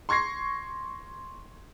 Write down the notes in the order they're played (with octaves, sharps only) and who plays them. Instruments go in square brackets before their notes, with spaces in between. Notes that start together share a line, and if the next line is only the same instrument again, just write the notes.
[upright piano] C6 C#6 G#6 A#6 C7